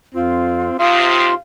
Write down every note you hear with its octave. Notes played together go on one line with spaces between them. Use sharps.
F2 C4 F4
D#2 C3 F4 F5 C6 D#6